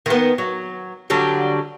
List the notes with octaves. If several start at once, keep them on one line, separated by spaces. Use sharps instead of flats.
D#3 B3
F#3
D3 F#3 G3